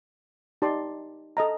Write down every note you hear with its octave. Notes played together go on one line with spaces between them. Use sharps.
D#4 G4 D5 A5 C6
A4 D#5 A#5